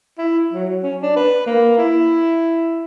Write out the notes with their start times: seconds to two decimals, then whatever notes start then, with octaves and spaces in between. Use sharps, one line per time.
0.18 E4
0.53 F#3
0.83 C#4
1.02 D4
1.16 B4
1.47 A#3
1.78 E4